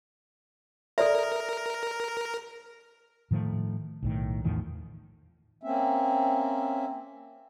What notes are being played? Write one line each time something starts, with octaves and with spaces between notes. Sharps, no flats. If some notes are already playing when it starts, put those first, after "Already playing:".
A4 A#4 D5 E5
A2 D#3 F3 A3
B1 A2 D#3
E2 A2 D#3 F3
A#3 C4 C#4 E5